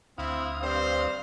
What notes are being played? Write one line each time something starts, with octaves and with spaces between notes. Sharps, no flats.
D2 C4 E4 F5 D#6
G2 C4 C5